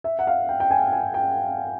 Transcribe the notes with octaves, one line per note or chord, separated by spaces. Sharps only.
E5
F#5
F5
G5
G5
G#5
G#5
G5